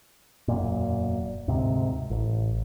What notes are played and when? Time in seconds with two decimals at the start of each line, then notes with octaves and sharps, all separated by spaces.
0.48 E1 F#2 A#2
1.48 D2 G#2 C3
2.10 A1